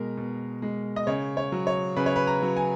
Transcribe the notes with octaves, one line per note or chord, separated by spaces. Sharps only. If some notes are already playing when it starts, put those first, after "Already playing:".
Already playing: B2 G#3 A#4
B2
G#3
D#5
C#3 C#5
C#5
F#3
C#5
C#3 B4
C#5
B4
A#5
F#3
G#5